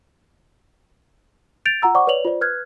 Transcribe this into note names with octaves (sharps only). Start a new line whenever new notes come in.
G6 A6 D7 F7
F4 F#5 A#5 E6
C5 D5 F#5 C#6 D6
B4 C#5 D5 F7 F#7
F4 C5 D5
B4 F6 F#6 G#6